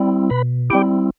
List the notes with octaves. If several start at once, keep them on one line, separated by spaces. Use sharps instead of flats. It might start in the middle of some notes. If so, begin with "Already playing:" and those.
Already playing: G3 C4 E4
B2 B4 B5
G3 C4 E4 G4 G5